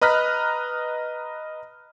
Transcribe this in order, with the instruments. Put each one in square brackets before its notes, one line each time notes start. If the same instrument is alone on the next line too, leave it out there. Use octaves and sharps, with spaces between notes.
[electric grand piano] B4 D#5 A#5 F6 F#6 B6